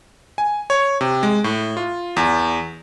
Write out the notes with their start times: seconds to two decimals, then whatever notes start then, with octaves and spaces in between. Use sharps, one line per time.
0.38 G#5
0.70 C#5
1.01 C3
1.23 G#3
1.44 A2
1.77 F4
2.16 E2